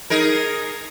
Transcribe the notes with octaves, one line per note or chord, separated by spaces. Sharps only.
D#4 G#4 A#4